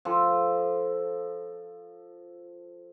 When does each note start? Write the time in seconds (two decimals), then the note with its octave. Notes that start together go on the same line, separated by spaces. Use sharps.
0.05 F3 A4